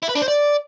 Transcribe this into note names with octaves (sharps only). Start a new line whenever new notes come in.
E4
B4
D4
C5
D5